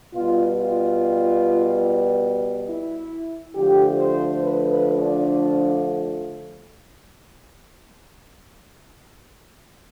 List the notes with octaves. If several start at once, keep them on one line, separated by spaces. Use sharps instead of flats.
B2 G3 F4
F4
E4
D3 F3 A3 G4
C5
B4
B4
D4